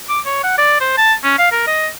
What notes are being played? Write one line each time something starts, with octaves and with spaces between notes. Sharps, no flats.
D6
C#5
F#5
D5
C5
A5
C#4
F5
A#4
D#5